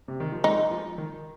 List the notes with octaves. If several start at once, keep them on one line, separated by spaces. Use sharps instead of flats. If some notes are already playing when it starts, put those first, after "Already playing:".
C3
D#3
F3
G#3 D#4
F3
D#3